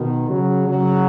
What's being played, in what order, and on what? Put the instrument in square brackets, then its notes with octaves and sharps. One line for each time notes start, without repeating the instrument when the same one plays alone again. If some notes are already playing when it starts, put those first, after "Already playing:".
Already playing: [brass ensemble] B2 D#3
C#3 F#3
C#3 F#3